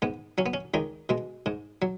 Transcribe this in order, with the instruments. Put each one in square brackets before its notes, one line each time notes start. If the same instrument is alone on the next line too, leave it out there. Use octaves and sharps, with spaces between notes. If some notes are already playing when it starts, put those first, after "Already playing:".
[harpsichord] G#2 B3
F#3 C#4
B3
C#4
C#2 D#3 D#4
B2 G#3
G#2
F#3